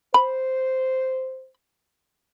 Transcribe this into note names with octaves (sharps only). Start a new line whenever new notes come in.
C5 B5